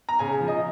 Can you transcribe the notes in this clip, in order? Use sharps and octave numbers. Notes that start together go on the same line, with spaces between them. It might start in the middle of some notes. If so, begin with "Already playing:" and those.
A#5
C#3 G#5
F3
D#5